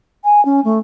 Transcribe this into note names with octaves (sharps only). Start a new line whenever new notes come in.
G#5
C#4
A3